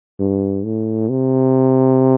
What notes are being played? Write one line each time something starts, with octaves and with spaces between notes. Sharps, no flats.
G2
A2
C3